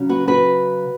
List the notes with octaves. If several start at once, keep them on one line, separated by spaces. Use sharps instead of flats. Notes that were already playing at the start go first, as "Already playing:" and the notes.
Already playing: C#3 F#3 C#4
F#4 B4
F#4 B4